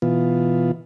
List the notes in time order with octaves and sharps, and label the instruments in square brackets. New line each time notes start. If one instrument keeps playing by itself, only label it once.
[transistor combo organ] B2 E3 B3 F4